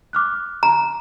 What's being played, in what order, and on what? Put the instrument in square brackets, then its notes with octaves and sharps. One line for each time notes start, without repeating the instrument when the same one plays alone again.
[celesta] D6 F6 F#6
[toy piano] A#5